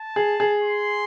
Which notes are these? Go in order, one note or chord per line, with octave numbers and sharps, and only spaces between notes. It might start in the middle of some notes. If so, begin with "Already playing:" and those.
Already playing: A5
G#4
G#4
C6